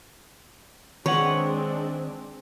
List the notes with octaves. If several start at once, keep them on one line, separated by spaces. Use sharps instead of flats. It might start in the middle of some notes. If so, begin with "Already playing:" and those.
D#3 G#3 C4 D4 B4 C#5 F#5